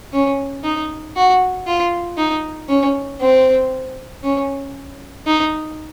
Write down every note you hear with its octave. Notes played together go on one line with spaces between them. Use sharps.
C#4
D#4
F#4
F4
D#4
C#4
C4
C#4
D#4